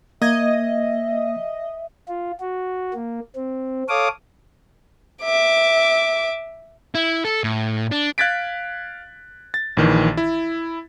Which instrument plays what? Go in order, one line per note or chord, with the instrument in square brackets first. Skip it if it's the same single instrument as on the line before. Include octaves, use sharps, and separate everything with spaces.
[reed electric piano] A#3 G#6 [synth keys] D#5 [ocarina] E5
[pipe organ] F4
F#4
A#3
C4
A4 C#5 F5 D6 D#6
[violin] E5 D6
[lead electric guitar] E4
A4
A2
D4
[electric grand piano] F5 F#6 G#6 A6 B6 D7
A6
A#1 D#3 E3
E4